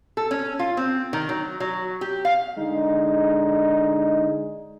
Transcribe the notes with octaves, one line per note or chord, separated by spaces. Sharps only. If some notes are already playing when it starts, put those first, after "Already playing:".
A4
C#4
F4
C4
D#3
F#3
F#3
G4
F5
D3 G#3 D#4